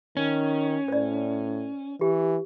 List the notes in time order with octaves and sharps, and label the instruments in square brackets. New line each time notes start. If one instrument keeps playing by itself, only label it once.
[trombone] D#3 [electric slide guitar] C#4
[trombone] A2 [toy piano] C5 D5
[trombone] E3 [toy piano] G4